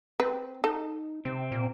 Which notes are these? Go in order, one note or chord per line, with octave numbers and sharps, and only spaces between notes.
C4 B4
D#4 A4
C3 C4
A#2